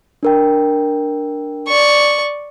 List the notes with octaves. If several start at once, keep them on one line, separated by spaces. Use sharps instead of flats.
D4 A#4 G5
D5 C#6